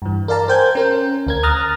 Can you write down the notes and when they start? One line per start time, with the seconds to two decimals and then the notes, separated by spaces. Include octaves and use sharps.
0.02 G2 E3
0.28 A#4 D5 F5 A5 A#5
0.48 A#4 C5 G5 G#5 G6 G#6
0.75 C#4 A#4 C5
1.27 D2 A#4 G#6
1.43 A#5 D#6 F6 F#6 A6 A#6